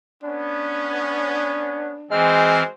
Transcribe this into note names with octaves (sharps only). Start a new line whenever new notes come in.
B3 C#4 D4
E3 G#3 C4 F#4 G#4 C5 F6